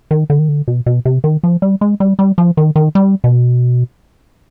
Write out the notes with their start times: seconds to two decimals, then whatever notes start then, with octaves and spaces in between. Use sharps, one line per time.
0.11 D#3
0.30 D3
0.39 D#3
0.49 D3
0.68 B2
0.86 B2
1.05 C3
1.24 D#3
1.43 F3
1.62 G3
1.81 G#3
2.00 G3
2.19 G3
2.38 F3
2.57 D#3
2.76 D#3
2.95 G3
3.24 B2